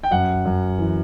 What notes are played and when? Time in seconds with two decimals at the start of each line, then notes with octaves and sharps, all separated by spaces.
0.03 G5
0.11 F#2 F#5
0.45 F#2
0.78 E3